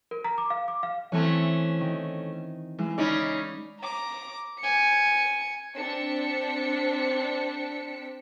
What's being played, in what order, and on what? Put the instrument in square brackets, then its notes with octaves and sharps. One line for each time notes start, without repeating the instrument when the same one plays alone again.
[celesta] A#4
A#5
D6
F5
D6
F5
[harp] E3 C4 [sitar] A3 C#4
[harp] D#3
[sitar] E3 [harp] G#3
[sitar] C#3 C#4 D#4 [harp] D5 B5
[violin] A#5 D6
G#5 C#7
[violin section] C4 D4 B6 C#7